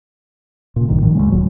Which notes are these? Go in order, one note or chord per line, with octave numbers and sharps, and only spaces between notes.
A#2 C#3
A#1 G2 D#3
A2 D#3 F3
D2 G3 G#3
D1 C#2 F#3